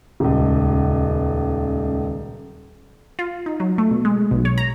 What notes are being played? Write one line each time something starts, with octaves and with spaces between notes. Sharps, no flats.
D#1 C#2
F4
D#4
F#3
A3
B2
G#3
B1
C#5
A#5